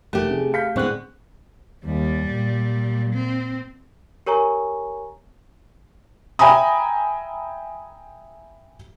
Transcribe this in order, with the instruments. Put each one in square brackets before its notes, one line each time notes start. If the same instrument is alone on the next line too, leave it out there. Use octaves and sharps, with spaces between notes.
[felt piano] F1 A#4 F#6 [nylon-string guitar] A3 G4
[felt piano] C3 G#4
[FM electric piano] F5 [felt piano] G6 B6 C#7
[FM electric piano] A2 C4 F#6 [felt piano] D3 C#6 [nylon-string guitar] G#3 B3
[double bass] D#2 [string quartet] G3
[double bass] A#2
[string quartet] C4
[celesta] G4 A#4 C#5 G#5 A#5 C#6
[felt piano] E5 G5 G#5 A#5 B5 D#6